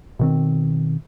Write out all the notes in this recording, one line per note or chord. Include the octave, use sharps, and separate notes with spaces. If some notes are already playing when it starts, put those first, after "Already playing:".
B2 D#3 C4